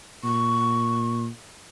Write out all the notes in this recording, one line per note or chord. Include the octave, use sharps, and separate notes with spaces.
A#2 C#6